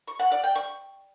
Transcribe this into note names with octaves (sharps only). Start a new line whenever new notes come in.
C#6
F#5
D5
G5
C#6